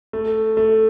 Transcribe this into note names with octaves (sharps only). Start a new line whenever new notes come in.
A3
A3